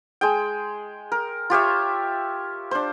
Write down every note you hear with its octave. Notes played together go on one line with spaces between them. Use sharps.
G#3 G#4 G5
A#4
F4 G4 C#5 E5
D4 C5